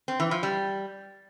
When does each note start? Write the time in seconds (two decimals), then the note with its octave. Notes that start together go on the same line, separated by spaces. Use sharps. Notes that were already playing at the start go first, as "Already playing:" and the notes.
0.08 C4
0.20 E3
0.31 F3
0.43 G3